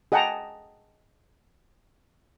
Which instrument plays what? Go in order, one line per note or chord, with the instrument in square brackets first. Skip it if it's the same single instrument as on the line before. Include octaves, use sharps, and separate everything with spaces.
[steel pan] G#4 D#5 F#5 G5 A5 A#5